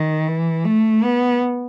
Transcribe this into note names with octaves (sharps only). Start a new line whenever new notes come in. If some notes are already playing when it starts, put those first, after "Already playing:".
Already playing: D#3
E3
A3
B3